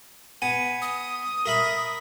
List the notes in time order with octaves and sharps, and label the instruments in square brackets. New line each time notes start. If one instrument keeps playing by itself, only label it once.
[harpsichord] B3 G#5
[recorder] D#6
[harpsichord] A#4 E5 B5